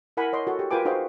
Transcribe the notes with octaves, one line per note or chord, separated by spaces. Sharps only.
E4 A#4 F#5 G#5 B5
C#5 D#5 C6
F#4 A4
G4
F4 A#4 B4 G5 G#5 D6
D#4 F#4 G#4 C5 F5 G5